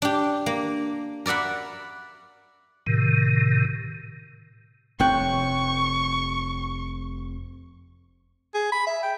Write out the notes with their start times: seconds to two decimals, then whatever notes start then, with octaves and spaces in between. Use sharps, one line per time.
0.02 D4 G4
0.46 A#3
1.26 A#4 D5 E5 F#5 B5
2.87 A2 C3 D#3
5.00 F1 C3 C4 C#5 G5 C#6 F#6
8.54 G#4
8.72 B5
8.87 E5
9.03 G5